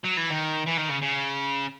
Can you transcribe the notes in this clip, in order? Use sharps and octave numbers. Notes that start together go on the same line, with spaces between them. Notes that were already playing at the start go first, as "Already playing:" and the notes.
F#3
E3
D#3
E3
D#3
C#3
C#3